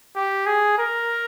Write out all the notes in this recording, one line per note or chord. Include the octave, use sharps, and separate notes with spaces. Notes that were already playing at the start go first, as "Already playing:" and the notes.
G4
G#4
A#4